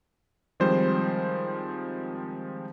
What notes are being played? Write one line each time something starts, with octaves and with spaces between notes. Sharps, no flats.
D#3 F3 G3 G#3 C4 C5